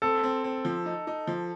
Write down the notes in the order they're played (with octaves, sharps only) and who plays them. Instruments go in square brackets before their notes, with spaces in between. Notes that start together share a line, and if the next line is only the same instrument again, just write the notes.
[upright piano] C4 [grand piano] A4
[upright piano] C4
C4
F3
D#4
D#4
F3